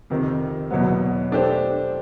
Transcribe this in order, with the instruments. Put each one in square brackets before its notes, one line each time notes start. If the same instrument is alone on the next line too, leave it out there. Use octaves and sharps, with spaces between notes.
[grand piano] F2 C3 D#3
E2 B2 F#3 B3
A3 D4 G4 C5